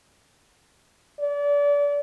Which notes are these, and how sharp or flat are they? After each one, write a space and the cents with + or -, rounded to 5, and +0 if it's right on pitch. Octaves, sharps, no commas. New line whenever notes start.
D5 -30